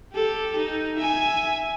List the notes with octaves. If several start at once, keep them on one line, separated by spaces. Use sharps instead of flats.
G4 A4
D#4
E5 G#5